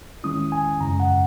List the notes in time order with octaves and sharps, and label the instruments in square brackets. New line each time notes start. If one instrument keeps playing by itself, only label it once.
[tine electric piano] D#3 G#3 C#4 E4 D#6
G#5
F#2 C#3 G#3 C#4 A#5
F#5